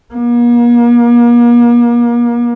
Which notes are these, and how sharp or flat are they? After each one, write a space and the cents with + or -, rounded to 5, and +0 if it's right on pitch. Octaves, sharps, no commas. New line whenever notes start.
A#3 +40